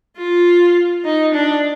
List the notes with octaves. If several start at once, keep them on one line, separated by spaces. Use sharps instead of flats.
F4
D#4
D4